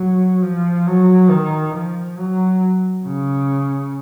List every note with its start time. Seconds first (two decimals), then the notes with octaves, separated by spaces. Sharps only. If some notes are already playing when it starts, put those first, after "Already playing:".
Already playing: F#3
0.42 F3
0.87 F#3
1.30 D#3
1.74 F3
2.18 F#3
3.05 C#3